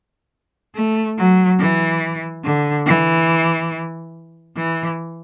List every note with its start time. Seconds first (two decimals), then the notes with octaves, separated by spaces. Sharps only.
0.75 A3
1.18 F#3
1.59 E3
2.44 D3
2.86 E3
4.56 E3